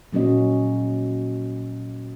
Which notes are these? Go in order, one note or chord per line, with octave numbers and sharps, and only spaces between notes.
A#2 F#3 A#3 C#4 F#4 D#5